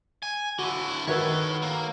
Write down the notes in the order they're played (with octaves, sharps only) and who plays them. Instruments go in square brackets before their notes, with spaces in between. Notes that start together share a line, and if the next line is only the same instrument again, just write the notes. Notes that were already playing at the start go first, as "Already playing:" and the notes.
[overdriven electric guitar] G#5
[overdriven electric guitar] D3 E4 [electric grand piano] F#4
[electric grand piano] D#3 F#4 B4 [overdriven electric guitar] A4 C#5
[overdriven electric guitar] A#3